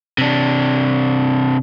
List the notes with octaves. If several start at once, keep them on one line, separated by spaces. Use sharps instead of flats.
C3 D4